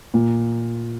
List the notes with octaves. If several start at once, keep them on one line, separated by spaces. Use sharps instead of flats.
A#2